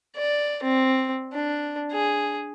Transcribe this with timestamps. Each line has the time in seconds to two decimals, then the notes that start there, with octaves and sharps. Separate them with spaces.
0.17 D5
0.63 C4
1.33 D4
1.92 G#4